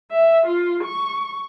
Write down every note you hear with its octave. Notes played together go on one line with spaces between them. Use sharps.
E5
F4
C#6